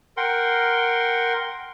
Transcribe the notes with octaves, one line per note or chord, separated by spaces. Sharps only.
A#4 F#5 G5 C6